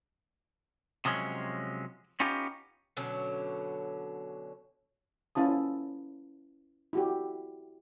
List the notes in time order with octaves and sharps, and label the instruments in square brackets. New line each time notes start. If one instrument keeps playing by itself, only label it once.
[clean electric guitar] C3 F3 F#3 G#3 C#4
B3 C#4 D#4 F4 G4
[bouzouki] B2 D3 F#3 C#4
[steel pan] C#4 E4 F4 A5 D#6
E4 F#4 G4